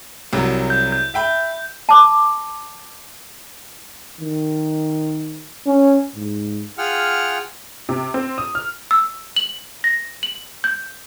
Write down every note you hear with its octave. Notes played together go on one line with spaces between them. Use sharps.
C2 C3 F#3
G6
G6
E5 G5 B5
A5 D6
D#3
C#4
G#2
F4 G#4 F#5 G5 F6
C3
C4
D#6
F6
E6
F#7
A#6
F#7
G6